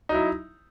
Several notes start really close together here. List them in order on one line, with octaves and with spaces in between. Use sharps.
D#4 F#3 E4